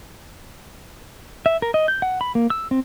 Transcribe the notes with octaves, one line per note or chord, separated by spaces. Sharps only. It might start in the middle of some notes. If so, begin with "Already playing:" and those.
E5
A#4
D#5
G6
F#5
B5
A#3
E6
C4